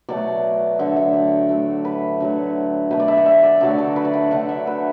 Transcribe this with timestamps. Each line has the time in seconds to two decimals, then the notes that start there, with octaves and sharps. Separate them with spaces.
0.09 B2 F#3 A3 D5
0.79 D3 F#3 A3 E5
0.96 E5
1.14 D5
1.49 A2 F#3 A3
1.85 B4
2.20 D3 F#3 A3
2.91 B2 A3 B4
3.00 D5
3.08 E5
3.17 F#5
3.26 E5
3.43 D5
3.61 D3 F#3 A3 D5
3.78 A4
3.96 B4
4.05 D5
4.14 F#5
4.31 D3 A3 F#5
4.49 E5
4.67 B4